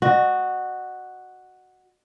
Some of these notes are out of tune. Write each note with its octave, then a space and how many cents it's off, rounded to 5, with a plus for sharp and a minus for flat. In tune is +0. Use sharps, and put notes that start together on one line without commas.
F#4 +0 D#5 -40